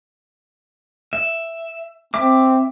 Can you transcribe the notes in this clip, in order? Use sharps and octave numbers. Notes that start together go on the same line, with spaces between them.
E5
C4 E5 D6